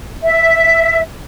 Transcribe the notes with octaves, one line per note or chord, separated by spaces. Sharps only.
E5